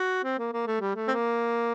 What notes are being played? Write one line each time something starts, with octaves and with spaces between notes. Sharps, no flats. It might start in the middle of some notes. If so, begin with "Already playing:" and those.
Already playing: F#4
C4
A#3
A#3
A3
G3
A3
C4
A#3